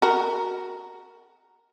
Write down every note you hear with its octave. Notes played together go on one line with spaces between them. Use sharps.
F#4 A#4